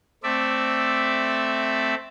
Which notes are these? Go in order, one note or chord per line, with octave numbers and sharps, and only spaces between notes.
A3 C4 D5 E5